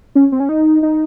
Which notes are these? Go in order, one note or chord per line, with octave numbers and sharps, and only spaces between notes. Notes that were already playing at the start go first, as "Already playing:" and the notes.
C#4
C4
C#4
D#4
D#4